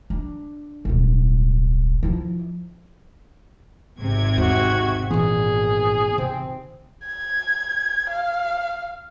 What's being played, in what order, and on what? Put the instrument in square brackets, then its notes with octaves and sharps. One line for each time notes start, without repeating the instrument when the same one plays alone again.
[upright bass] D4
D1 B1
F3 E4
[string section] G#1 C3 G#6
[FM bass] E2 [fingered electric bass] G#2 [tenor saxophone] F#4
[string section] G#1 [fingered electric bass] A#2 B3 [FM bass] E3 [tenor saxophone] G#4
[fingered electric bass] C3 [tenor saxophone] C4
[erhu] G#6
F5